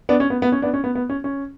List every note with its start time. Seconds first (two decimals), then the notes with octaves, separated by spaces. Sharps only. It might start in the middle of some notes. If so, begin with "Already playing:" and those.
0.09 B3 D4
0.20 C#4
0.30 B3
0.42 B3
0.52 C#4
0.62 B3 D4
0.74 C#4
0.84 B3
0.95 B3
1.09 C#4
1.24 C#4